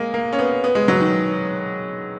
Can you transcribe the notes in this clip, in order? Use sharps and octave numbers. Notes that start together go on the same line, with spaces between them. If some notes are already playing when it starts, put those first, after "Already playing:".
Already playing: G#3 A#3
A#3
C#4
B3
B3
G#3
F#3
D#3